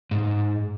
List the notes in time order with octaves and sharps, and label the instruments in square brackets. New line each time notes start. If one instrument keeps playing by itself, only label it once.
[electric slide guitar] G#2